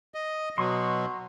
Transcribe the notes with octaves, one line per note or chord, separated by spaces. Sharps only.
D#5
B2 F#3 C6 C#6 D#6